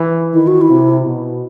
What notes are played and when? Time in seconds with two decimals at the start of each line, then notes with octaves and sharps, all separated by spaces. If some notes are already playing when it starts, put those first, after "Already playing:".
Already playing: E3
0.34 D#3 E4
0.47 F#4
0.61 E4
0.70 C3
1.05 B2